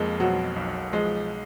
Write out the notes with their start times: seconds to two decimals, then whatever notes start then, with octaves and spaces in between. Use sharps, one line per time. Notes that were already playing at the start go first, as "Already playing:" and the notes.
Already playing: F2 F3 G#3 A#3
0.20 B2 F#3
0.56 B1
0.93 F3 G#3